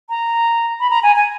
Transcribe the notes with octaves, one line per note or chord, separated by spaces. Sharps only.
A#5
B5
A#5
G#5
G#5